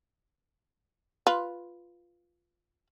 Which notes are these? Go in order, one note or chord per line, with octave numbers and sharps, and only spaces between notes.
F4 B4